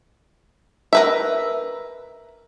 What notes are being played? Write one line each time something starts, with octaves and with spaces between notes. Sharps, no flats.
A#4 B4 E5